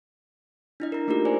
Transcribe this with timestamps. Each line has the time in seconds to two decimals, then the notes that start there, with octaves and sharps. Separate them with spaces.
0.80 D4 E4 D#5
0.92 A#4 A#5
1.08 A3 A#3 D#4 F4 G4 A#4
1.25 G#4 C5 D5 G#5